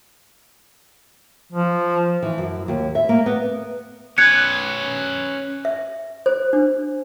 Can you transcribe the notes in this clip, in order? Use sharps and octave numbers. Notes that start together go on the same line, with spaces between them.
F3
E3
F#2
D#2
E5
A#3
B3
C#4 B4 F#6 G#6 C#7
E5
C5
D4